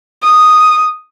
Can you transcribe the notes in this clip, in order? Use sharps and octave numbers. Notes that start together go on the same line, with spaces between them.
D#6